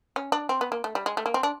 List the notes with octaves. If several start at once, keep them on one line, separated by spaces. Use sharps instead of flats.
C#4
D4
C4
B3
A#3
A3
G3
G#3
A3
A#3
C4
D4